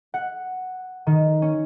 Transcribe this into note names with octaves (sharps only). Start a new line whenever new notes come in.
F#5
D#3
C#4